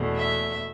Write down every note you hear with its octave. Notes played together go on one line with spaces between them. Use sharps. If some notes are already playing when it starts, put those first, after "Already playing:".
Already playing: E2 B2 A3
E5